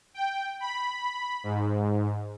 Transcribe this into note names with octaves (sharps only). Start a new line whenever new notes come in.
G5
B5
G#2